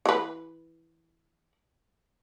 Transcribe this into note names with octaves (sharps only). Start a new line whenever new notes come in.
E3 B4